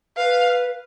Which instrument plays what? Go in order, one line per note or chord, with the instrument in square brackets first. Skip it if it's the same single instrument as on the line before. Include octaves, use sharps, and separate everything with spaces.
[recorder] B4 [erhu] F5